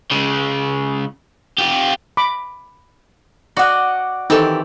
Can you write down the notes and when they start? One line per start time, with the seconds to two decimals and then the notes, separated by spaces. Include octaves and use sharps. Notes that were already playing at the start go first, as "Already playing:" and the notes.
0.11 C#3 G#3
1.58 F4 G4
2.17 B5 D6
3.57 F#4 D5 D#5 F#5
4.30 D#3 E3 C4 D#4 G4 A4